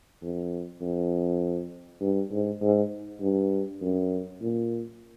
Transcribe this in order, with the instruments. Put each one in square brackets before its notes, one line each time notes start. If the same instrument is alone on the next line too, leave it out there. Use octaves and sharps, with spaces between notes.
[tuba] F2
F2
G2
G#2
G#2
G2
F#2
A#2